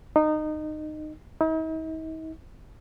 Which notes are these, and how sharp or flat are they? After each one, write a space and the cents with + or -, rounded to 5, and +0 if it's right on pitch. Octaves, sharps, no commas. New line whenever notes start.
D#4 -20
D#4 +45